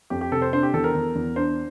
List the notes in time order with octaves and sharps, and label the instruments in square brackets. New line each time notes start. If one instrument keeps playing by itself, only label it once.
[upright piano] F2 [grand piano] G4
[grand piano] G4
[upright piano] C3 [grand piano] A4
[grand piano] C5
[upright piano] D4 [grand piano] C5
[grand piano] G4
[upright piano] E2 [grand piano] A4
[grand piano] A#4
[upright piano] E2
E2
[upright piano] D4 [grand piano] C5